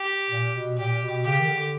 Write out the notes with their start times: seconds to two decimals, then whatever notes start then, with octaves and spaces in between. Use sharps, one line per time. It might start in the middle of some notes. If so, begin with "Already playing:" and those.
Already playing: G4
0.30 A#2
0.54 B2
0.77 A#2 G4
1.01 B2
1.24 C#3 G4
1.39 D#3
1.48 D3